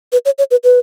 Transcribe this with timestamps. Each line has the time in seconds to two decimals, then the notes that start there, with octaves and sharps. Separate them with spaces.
0.12 B4
0.25 C#5
0.38 C#5
0.51 B4
0.64 B4